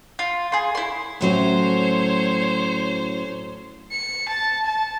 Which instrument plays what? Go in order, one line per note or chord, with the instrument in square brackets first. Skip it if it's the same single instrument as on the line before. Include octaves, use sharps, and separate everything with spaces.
[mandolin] F4
G#4 C6
E4 C6
[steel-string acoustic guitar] A2 F#3 C#4 [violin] C5 C#5
[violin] C#7
A5
A5